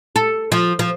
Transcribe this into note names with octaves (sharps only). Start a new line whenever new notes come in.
A4
F3
F3